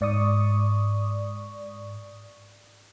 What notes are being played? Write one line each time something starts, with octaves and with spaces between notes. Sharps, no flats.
G#2 D5 C#6 D#6